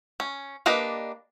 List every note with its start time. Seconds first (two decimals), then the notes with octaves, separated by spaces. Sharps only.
0.20 C#4
0.66 A#3 D4 G4 B4 D#5